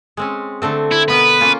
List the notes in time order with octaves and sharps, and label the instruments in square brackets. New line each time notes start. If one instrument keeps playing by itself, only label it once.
[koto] G#3 C4 C#4
D3 A3 C4
[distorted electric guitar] E4
[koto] B2 B3 A#4 [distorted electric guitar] B4
[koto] A#3 C#4 F4